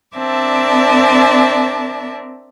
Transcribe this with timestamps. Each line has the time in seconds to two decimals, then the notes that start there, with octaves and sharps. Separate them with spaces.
0.17 C4 D4 A#4 D5 E5 A5